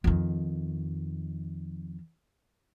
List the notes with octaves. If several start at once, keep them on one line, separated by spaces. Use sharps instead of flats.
F2 D#3